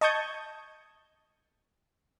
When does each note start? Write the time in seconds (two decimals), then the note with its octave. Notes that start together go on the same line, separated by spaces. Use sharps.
0.01 D#5 A5 C#6 D#6 G6 G#6